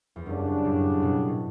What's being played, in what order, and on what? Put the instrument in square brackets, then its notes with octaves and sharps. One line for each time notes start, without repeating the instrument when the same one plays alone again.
[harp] E2
[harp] F#2 [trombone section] C#3 G3 D4
[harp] F#2 A2
G2 B2
A2